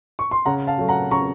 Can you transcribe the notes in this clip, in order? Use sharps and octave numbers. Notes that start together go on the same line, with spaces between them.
C#6
C6
C#3 F#5 A#5
F5 A5
F#3 A3
F#5 A#5
C#3 A#5 C#6